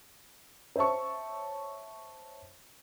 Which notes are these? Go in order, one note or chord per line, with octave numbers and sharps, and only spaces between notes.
C5 C#5 E5 A5 C#6